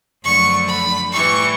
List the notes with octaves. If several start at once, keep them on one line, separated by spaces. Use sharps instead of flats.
F#2 D3 F3 A3 C#6
B5
A2 E3 G3 C#6